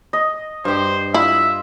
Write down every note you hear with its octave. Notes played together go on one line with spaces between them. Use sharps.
D#5
G2 G4 C5
E4 F4 E5